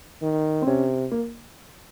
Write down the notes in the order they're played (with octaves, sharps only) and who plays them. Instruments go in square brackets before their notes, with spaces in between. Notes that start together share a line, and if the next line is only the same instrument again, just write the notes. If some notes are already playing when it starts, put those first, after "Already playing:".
[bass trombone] D#3
[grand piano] C4
[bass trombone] C3 [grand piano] C#4
[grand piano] A#3